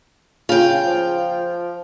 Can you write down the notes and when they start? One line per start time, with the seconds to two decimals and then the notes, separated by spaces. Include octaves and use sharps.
0.49 C#3 F4 G5
0.86 F3